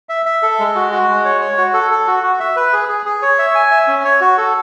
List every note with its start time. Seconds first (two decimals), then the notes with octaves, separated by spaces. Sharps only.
0.09 E5
0.26 E5
0.43 A4
0.59 G#3
0.75 F#4
0.92 F#4
1.08 G#3
1.25 C#5
1.41 C#5
1.58 F#4
1.74 A4
1.91 A4
2.07 F#4
2.23 F#4
2.40 E5
2.56 B4
2.73 G#4
2.89 G#4
3.06 G#4
3.22 C#5
3.39 E5
3.55 G#5
3.71 E5
3.87 C#4
4.05 C#5
4.21 F#4
4.38 A4